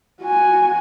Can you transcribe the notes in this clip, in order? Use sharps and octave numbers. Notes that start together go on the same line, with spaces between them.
F#4 G#5